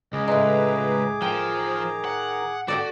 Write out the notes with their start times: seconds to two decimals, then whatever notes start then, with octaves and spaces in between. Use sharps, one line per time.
0.13 C#2 G#4 D#5 D6
0.28 A2 G#3 B4 A#5
1.22 D#3 F3 G5 A#5
2.05 F#5
2.68 F#4 G4 A4 D5